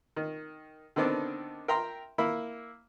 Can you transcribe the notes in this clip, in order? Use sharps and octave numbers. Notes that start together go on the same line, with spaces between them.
D#3
D3 D#3 B3 C4 D4 D#4
A#4 E5 G5 A#5 C6
A#3 E4 B5